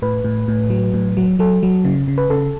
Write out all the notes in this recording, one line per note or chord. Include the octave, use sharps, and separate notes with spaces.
A2 B4
A2
A2
F#3
A2
F#3
F#3 A4
F#3
C#3
C#3
B4
C#3 A4